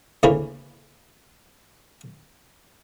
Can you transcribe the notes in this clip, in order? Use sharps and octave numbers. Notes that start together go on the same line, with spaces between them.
D2 C#3 E3 A#3 C#4 B5